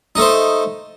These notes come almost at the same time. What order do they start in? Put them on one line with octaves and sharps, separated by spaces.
D#4 A3 C5